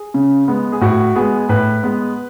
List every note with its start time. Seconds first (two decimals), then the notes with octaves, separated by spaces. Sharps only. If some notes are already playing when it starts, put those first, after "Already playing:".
Already playing: G#4
0.14 C#3
0.48 G#3 B3
0.72 G#4
0.81 A2 F#4
1.16 G#3 B3 G#4
1.49 A2 B4
1.83 G#3 B3